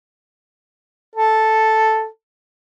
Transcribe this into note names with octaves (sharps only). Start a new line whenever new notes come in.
A4